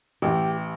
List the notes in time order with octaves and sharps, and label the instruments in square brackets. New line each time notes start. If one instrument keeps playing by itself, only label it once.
[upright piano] A1 [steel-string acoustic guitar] G4